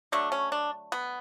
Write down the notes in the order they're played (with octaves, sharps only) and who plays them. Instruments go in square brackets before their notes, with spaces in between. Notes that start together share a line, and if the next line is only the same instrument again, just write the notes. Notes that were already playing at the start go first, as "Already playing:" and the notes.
[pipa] D3 F#3 A3 D4
C#4
D4
B3